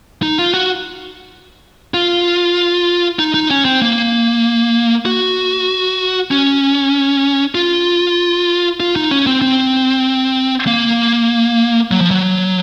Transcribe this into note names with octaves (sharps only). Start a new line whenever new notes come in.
D#4
F4
F#4
F4
D#4
D#4
C#4
C4
A#3
F#4
C#4
F4
F4
D#4
C#4
C4
C4
A#3
F#3
F3
F#3